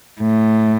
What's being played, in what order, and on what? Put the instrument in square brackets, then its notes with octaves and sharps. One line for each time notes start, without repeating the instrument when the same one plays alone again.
[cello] A2